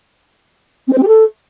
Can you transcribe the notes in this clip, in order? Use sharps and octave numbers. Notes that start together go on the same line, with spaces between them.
C4
C5
C4
G4
A4